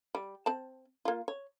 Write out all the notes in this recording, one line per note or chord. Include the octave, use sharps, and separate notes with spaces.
G3
C4 A5
A#3 F4
C#5